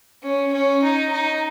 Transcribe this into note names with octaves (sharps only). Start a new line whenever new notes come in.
C#4
C#4
D#4
D#4